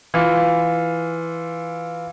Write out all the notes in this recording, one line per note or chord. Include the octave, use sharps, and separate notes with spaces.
E3 F4